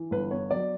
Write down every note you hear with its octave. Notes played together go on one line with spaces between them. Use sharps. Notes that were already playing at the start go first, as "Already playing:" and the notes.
Already playing: E3
G1 B4
B3 C#5
F#3 D5